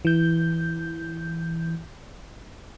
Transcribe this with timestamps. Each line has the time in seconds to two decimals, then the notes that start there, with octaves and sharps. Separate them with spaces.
0.05 E3 G6